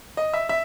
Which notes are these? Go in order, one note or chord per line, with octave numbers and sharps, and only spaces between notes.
D#5
E5
E5